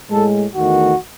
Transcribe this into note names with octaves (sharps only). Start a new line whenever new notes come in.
A2 G#3 A4
E2 D#3 A3 F#4